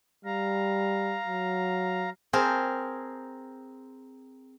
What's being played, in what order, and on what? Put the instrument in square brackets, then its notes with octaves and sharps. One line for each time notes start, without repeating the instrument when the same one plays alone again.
[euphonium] G3 [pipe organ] F5 A#5
[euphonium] F#3
[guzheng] C4 G#4 A#4 A5